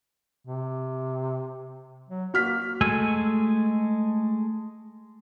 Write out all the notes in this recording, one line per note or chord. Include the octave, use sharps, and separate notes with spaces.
C3
F#3
A#3 F#4 F6 B6
G#3 A3 G#5 E6